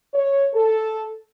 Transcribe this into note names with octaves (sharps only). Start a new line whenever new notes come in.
C#5
A4